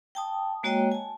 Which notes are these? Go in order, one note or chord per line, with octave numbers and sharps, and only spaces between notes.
G5 A5 D#6
G#3 A#3 F#4 C#5 D#5 G5
G#5 A5